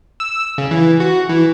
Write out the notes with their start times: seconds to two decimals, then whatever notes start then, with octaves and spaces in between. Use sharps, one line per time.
0.20 E6
0.58 C#3
0.71 E3
1.00 F#4
1.29 E3